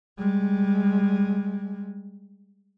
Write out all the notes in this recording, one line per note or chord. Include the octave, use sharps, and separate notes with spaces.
G3 G#3